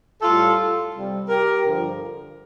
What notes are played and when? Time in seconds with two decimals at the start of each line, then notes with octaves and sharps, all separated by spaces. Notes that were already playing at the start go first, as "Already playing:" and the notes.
0.22 A2 G3 F4 A4
0.93 C3 G3
1.29 G4 A#4
1.65 G2 D3 F3